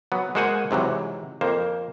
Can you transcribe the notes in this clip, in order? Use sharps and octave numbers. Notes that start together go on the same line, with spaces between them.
F#3 B3
G#3 A#3 F#4 C5 F#5 G#5
G#2 C3 E3 F#3
F2 A#3 C5